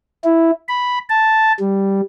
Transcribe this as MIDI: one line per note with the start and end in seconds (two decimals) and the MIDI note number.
0.24 0.51 64
0.69 0.99 83
1.09 1.52 81
1.60 2.01 55